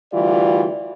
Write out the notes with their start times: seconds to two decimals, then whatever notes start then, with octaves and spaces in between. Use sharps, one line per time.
0.13 D2 E3 G3 F4 F#4 D5